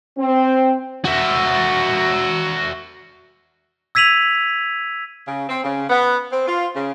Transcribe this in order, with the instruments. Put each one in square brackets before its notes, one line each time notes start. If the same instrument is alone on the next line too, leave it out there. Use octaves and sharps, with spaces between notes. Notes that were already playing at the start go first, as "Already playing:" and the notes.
[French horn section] C4
[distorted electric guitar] F#4 E5
[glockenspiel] E6 G#6 B6 D#7 F7 F#7
[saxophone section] C#3
C4
C#3
B3
C4
F4
C#3